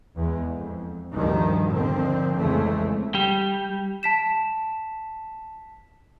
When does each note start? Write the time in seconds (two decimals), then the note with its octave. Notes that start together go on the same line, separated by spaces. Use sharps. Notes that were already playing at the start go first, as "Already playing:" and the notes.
0.16 E2 G#3
0.50 F2
1.13 D2 G2 D#3 F3 G3
1.69 D3 D#3 F3 C4
2.36 F2 C#3 E3 F3 G#3 A3
3.15 G3
4.03 A5 B6 E7